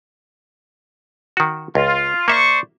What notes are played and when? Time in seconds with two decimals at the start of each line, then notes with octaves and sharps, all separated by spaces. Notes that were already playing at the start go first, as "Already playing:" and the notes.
1.37 D#3 F#4
1.75 C#2 F4
2.28 A#3 C5 D5 E5 C#6